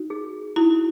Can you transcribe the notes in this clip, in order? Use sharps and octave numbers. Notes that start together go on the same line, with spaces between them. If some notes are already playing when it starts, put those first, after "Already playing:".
Already playing: D#4 F#4
G#4
D#4 E4 F#4